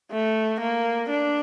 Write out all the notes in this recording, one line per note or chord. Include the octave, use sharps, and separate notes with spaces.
A3
A#3
D4